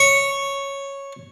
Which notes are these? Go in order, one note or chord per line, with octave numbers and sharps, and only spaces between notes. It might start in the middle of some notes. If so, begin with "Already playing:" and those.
Already playing: C#5